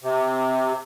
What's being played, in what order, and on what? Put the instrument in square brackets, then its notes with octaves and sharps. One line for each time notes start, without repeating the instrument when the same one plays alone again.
[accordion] C3